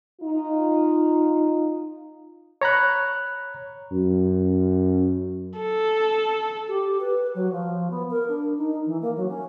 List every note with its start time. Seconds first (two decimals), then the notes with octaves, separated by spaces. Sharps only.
0.21 D#4 F4
2.61 C#5 A#5 B5 F#6
3.92 F#2
5.60 A4
6.68 G4
7.01 B4
7.35 F#3
7.52 F3
7.90 B3
8.10 A#4
8.28 D4
8.57 D#4
8.86 E3
9.02 A#3
9.16 F#3
9.29 C#4